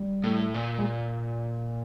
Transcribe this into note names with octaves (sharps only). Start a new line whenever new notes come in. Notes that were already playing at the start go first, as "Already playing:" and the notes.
Already playing: G3
A2
A#2
G#3